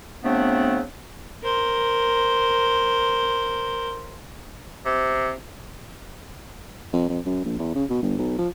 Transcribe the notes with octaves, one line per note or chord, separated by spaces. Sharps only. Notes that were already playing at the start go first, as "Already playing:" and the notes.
C#3 F3 A3 B3 C4 D4
A#4 C5
C3
F2
F2
F#2
A#1
E2
C#3
B2
G1
B1
F3